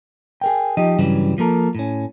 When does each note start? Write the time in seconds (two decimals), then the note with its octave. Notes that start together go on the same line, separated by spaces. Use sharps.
0.41 G#4 A#4 G5
0.77 F3 D#4 G4 D#5
0.98 G2 C#3 E3 F#3 G3
1.38 F3 A#3 A4 A#4
1.75 A2 C#4